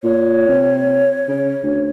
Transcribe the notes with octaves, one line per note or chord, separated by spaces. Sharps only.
A#2 C#5
C3
C#3
D2